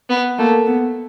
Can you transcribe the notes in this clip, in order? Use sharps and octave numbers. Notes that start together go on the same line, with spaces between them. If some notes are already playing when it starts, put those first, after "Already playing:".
B3
A3 A#3
B3